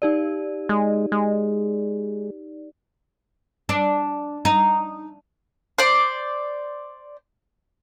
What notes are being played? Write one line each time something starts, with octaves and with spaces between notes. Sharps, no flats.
D#4 G4 D5
G#3
G#3
D4
D#4
C5 D5